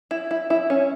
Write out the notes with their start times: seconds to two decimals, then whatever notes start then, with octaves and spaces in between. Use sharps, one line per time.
0.11 E4
0.31 E4
0.50 E4
0.70 C#4